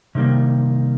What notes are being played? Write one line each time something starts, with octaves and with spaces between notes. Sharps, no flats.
C3 D#3 G3 A#3